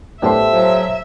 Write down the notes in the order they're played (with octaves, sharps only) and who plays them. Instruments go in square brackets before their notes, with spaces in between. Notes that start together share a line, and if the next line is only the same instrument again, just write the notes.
[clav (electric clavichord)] A2 B3 D4 [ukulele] G4 A4 C5 [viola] E5
[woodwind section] F3 F#3